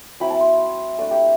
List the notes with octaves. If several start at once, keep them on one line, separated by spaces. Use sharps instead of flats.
F#3 C4 E4 B5
A5
C6
A3 D4 D5
G4